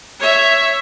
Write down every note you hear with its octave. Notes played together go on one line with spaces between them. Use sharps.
C#5 E5